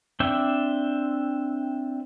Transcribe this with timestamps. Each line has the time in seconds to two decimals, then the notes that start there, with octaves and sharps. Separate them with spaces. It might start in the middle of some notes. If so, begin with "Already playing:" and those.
0.20 C4 D4 C5 E5 G5